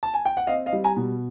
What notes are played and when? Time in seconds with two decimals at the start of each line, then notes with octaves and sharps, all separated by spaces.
0.03 A5
0.14 G#5
0.25 G5
0.37 F#5
0.47 C4 D#5 F5
0.66 D#5 F5
0.73 G3
0.84 G#5 A#5
0.96 B2